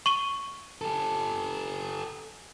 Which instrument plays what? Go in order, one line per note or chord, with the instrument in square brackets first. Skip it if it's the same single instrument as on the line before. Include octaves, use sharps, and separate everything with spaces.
[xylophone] C#6 D#7 G7
[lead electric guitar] G4 A4